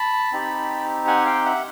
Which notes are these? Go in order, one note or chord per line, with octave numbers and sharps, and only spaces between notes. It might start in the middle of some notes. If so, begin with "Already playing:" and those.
Already playing: A5 B5
C4 D#4 G4
F#5 G#5
F5 G5
E5 F#5